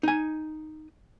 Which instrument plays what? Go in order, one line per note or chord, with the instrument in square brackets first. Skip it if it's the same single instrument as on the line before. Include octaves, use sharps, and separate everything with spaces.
[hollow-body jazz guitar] D#4 G#5